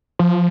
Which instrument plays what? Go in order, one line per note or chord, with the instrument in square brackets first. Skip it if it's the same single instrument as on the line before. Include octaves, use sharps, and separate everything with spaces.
[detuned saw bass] F3